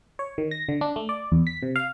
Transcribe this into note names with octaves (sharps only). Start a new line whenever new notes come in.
C#5
D#3
A#6
D3
D4
A3
D5
E2
B6
C3
F5